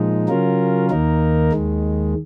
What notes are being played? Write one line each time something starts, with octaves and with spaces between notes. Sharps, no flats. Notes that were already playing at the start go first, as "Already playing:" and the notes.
Already playing: A#2 F3 G#3 D#4
C#3 F#3 C#4 F4 A#4
D#2 D#3 A#3 D#4 A#4
D#2 D#3 G#3